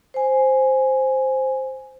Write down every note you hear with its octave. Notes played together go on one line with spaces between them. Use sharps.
C5 G#5